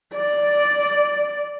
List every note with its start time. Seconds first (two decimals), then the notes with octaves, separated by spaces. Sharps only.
0.15 D5